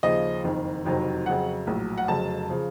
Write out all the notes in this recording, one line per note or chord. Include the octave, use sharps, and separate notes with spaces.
D#2 C#3 F3 D#5
F#1 F2 D#3
F#1 F2 C3 D#3 F#3
F2 C#3 F#3 F#5
A#1 A2 F#3
F#5
F1 F2 C#3 F#3 A5
C#3 F3